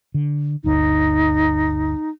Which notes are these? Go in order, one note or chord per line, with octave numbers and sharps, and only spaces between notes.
D3
G1 D2 D#4